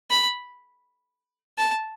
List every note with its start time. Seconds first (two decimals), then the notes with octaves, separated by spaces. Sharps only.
0.10 B5
1.58 A5